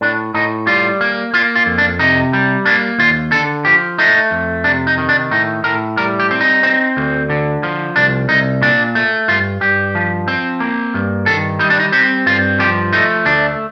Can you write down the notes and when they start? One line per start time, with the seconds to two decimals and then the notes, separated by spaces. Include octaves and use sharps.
0.01 A2 D4
0.34 A2 D#4
0.67 G3 F4
1.01 A#3
1.34 A#3 F4
1.55 F4
1.66 F2
1.78 D4
1.99 C3 D#4
2.33 G3
2.66 A#3 D4
2.99 D#2 F4
3.32 D3 A4
3.65 F3 G4
3.98 A3 D#4
4.31 F2
4.64 C3 D4
4.87 D#4
4.98 D#3
5.09 D4
5.31 A2 D#4
5.64 A2 A#4
5.97 G3 A#4
6.20 G4
6.31 C4
6.41 D#4
6.63 C4
6.97 D2
7.30 D3
7.63 F3
7.96 C2 D4
8.29 C2 D#4
8.62 A#2 D4
8.95 A3
9.28 G2 F4
9.61 G2 G4
9.95 F3
10.28 C4
10.60 A#3
10.94 G2
11.26 D#3 A4
11.59 G3 D#4
11.70 D4
11.80 D#4
11.92 C4 G4
12.26 G2 F4
12.59 F3 G4
12.93 A3 D#4
13.25 D2 D4